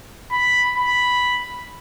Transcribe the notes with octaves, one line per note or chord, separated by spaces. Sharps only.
B5
B5